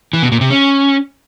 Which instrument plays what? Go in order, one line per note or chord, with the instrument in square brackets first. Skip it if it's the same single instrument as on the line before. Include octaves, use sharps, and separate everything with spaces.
[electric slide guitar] E3
B2
A#2
C3
C#4